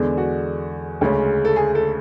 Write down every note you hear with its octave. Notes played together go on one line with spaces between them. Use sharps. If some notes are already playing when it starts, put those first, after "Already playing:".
Already playing: E2 D3 G#3 D4
F#4
D2 C#3 G#3 C#4
A4
G#4
A4